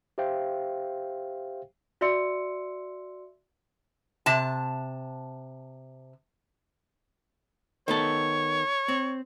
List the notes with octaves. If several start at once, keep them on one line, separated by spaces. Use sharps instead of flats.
G4 C5 E5 F5 G5
F#4 D5 E5 C6 E6 C#7
C3 A5
D#3 B3 A4 C#5
C4